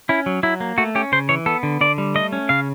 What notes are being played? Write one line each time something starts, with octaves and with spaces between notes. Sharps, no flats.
C#4 E4
F#3
F#3 E4
A#3
A3 F#4
C#4 G4
C#3 C5
E3 C#5
B3 A4
D3
D3 D5
G3
A3 D#5
C#4
C#3 F5